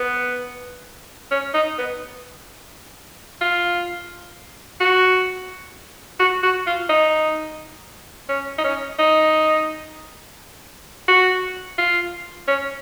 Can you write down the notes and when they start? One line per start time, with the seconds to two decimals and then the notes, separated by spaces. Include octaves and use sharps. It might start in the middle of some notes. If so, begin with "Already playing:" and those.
Already playing: B3
1.31 C#4
1.54 D#4
1.78 B3
3.41 F4
4.80 F#4
6.20 F#4
6.43 F#4
6.67 F4
6.89 D#4
8.29 C#4
8.58 D#4
8.64 C#4
8.99 D#4
11.08 F#4
11.78 F4
12.48 C#4